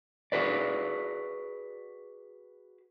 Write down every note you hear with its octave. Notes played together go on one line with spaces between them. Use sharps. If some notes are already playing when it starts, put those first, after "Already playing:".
F#4 G#4 B4 D5